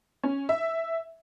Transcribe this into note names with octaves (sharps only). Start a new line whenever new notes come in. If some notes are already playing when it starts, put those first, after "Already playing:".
C#4
E5